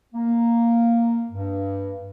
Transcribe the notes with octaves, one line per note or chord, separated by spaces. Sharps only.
A#3
G2